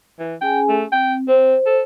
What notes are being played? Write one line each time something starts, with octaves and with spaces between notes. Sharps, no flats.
E3
C#4 G#4 G5 G#5
A3
C4 G5
C4 C5
A4